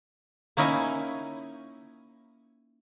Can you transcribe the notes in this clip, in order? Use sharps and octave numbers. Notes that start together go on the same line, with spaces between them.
A#3 C#4 D#4 E4 F#5 G#5